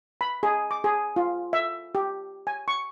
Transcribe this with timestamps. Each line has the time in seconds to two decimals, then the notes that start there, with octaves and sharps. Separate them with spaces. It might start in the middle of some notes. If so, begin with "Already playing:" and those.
0.21 B5
0.43 G#4
0.71 D6
0.84 G#4
1.16 F4
1.53 E5
1.95 G4
2.47 G#5
2.68 C#6